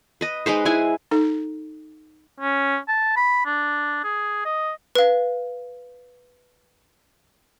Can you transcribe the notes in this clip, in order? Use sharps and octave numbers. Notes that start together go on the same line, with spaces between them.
B4 D#5
G#3 D#4 B4 C5
G#3 E4 G#5
D#4 A4
C#4
A5
B5
D4
G#4
D#5
B4 F5